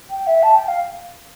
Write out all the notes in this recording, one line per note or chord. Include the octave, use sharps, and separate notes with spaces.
G5
E5
A5
G5
F5